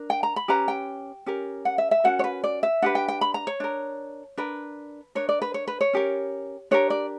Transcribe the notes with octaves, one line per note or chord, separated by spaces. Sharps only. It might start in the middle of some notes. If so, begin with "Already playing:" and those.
Already playing: D4 A#4
G5
A#5
B5
C#4 G4 B4 A#5
G5
C#4 G4 A#4
F#5
E5
E5
C#4 F#4 A#4 F#5
C#5
B4
D5
E5
D4 G4 B4 F#5
G5
G5
B5
A#5
C#5
D4 A#4
D4 A#4 B4
D4 A#4 C#5
D5
B4
C#5
B4
C#5
C#4 G4 A#4
D4 G4 A#4 C#5
D5